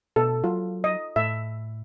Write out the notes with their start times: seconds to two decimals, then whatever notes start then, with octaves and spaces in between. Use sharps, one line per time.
0.16 B2 A4
0.44 F#3 F4
0.84 D#5
1.16 A2 E5